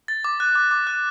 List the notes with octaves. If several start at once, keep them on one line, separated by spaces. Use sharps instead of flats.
A6
D6
F#6
D6
D6
F#6